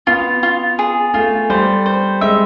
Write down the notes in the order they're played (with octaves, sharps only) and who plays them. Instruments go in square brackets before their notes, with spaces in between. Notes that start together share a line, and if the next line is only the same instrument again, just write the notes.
[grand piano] B3 [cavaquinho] F4
[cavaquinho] F4
G#4
[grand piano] A3 [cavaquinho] F4
[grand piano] G3 [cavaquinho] C5
[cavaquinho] C5
[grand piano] G#3 [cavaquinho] E5